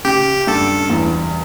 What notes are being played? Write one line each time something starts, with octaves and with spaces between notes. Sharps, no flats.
C#3 G4
G2 A4
E2